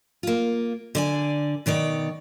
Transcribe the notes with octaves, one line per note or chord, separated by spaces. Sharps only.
A#3 F4
D3 D5 G#5
B2 D#3 C#5 D5